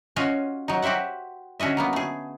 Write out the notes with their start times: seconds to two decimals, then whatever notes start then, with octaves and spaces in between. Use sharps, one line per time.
0.16 C#4 F4 F#4 D#5 F5
0.68 F#3 D#4
0.82 F#4 G4 C5 E5 F#5
1.60 D3 C#4 F#4 D#5 E5
1.77 F#3 A#3 B3
1.93 A3 G#4